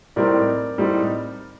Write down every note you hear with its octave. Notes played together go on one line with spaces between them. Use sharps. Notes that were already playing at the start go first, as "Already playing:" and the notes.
A2 G3 C4 D#4 A#4 D5
A2 G3 C4 D#4